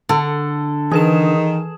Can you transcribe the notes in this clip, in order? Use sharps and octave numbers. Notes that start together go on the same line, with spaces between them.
D3 A4
D#3 E3 G#4 B4 E7